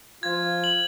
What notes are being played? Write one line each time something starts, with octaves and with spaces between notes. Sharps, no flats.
F3 F4 G#6
F#7